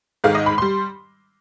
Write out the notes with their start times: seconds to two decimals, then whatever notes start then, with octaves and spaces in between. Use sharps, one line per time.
0.24 G#2 D#3 G#3 F5
0.35 D#5
0.46 B5
0.58 G3 C6